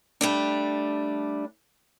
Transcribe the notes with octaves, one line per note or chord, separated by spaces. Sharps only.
G3 A3 D4